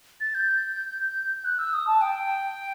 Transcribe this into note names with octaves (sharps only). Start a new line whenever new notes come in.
A6
G6
F#6
E6
D#6
A5
G5